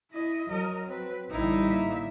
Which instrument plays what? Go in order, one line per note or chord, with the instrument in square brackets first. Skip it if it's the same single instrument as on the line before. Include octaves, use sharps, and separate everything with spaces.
[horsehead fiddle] E4 D#5
[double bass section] F#3 [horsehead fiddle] A#4 D#5
[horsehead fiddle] C4 B4
[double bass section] A1 D3 G3 [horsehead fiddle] C4 [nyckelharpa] D#4 E4
[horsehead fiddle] A#3 E5